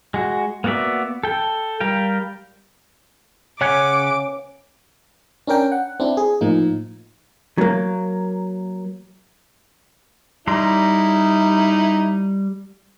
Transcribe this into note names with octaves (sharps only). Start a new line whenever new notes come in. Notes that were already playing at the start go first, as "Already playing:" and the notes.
G#3 F#4
A#3 B3 F#4 D5 E5
A4 G5
G3 A#4 F5 G5
C#3 C#4 F#5 G#5 D6
C#4 D4 A#4 G5
F#5
C4 D4 E4
G#4
A2 F3 A#3 D#4
F#3 A#3
G3 D#4 E4 A#5 C6